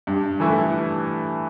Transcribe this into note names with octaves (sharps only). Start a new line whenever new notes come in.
G2
E3 A3 E4